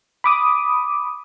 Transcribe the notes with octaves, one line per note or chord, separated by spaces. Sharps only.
B5 D6 D#6